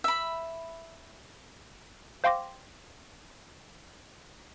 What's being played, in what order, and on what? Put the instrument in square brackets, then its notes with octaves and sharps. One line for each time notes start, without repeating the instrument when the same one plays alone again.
[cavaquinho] E5 B5
[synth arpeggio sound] C5 F5 G5 C6 D6 A#6